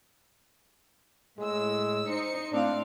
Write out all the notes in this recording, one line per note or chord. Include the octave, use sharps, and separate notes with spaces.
A2 G#3 E6
D#4 C5 C#7
A2 C4 D4 F5